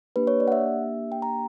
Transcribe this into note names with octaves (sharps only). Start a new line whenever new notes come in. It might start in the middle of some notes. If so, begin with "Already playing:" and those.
A#3 D4 G4 B4
C#5
D5
F#5
E5
G5
A#5